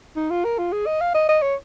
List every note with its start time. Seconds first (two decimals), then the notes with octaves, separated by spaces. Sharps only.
0.16 D#4
0.30 F4
0.44 A#4
0.58 F4
0.73 G#4
0.86 D#5
1.01 F5
1.15 D#5
1.29 D#5
1.42 C#5